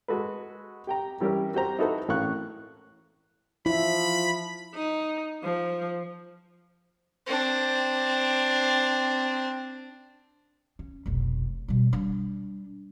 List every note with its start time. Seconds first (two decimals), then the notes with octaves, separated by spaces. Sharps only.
0.08 G#3 F#4 A4 B4
0.87 G4 G5 A#5
1.20 E3 G3 C#4 G4 A#4
1.54 F#4 G4 C5 A#5
1.79 D#4 E4 F#4 A4 B4 C5
2.08 A1 A2 A#4 F5 C#6 F#6
3.66 F3 E4 B5
4.75 D#4
5.44 F3
7.26 C4 D4
10.79 C#4
11.06 F1 B1
11.68 B2 G3
11.93 G3 D4